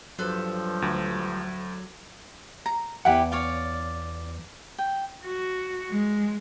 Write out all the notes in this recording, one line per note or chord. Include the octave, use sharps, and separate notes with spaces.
G2 F3 F#3 A4 B4 C5
D2
A#5
E2 E4 G4 B4 F#5
C#5 D5 F5
G5
F#4
G#3